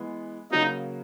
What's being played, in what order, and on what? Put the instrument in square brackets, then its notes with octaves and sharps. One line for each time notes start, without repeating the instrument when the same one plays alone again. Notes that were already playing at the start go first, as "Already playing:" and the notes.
Already playing: [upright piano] E3 G#3 B3
[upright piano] C#3 F#3 A#3 [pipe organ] D#4